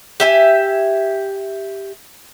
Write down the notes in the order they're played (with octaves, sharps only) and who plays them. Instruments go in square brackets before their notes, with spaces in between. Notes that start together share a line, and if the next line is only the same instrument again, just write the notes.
[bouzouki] G4 E5 G#5